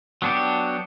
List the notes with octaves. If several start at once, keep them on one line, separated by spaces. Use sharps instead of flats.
F#3 B3 D4 F#4 G4